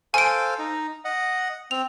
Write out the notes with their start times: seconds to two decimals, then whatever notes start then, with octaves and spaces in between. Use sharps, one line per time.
0.14 A4 C5 F5 G#5 D7
0.59 D#4
1.05 D#5 F#5
1.71 C4 F7